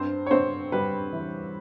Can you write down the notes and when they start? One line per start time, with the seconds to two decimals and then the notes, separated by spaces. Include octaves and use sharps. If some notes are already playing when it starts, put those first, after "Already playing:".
Already playing: G2 C4 C5
0.26 C#5
0.31 G2 C4 C5
0.72 G3 B4
1.13 E3